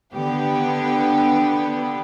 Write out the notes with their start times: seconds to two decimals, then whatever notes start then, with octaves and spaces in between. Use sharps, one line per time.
0.14 D3 B3 G4